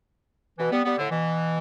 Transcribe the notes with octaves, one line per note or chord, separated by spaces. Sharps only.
B2 E3
G3 B3
G3 B3
A2 D3
B2 E3